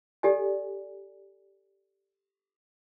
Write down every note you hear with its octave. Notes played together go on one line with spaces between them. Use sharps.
G4 A4 D5 D#5 G#5